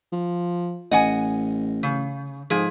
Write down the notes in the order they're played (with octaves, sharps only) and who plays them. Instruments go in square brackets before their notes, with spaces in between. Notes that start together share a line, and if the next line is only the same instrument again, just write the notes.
[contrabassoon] F3
[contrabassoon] A1 [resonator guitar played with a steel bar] D#5 F#5 G#5
[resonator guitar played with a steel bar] C#3
[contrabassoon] G#2 [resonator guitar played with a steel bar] F3 G#4